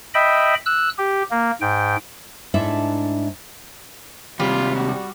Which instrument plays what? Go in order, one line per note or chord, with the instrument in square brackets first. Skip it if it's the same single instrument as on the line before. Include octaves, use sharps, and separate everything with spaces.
[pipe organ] D#5 E5 G5 B5
E6 F#6
G4
A#3
G#2 G5
[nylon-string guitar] G#2 A3 D4 E4 E5
[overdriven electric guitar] D#2 C3 [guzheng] G3 [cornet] F4
[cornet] F#4